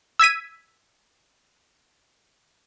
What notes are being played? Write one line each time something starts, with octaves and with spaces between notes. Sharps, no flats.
E6 G#6 B6 D#7